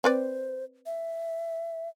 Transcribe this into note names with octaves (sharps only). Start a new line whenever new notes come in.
C4 B4 C5 D5
E5